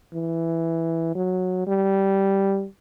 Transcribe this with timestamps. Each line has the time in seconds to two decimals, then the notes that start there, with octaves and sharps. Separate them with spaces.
0.14 E3
1.15 F#3
1.67 G3